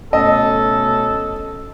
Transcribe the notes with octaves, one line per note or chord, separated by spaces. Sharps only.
B2 A3 C#4 A4 D#5